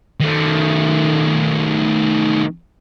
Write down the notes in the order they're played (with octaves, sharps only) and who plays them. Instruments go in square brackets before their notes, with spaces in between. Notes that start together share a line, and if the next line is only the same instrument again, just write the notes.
[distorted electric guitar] D#3 A3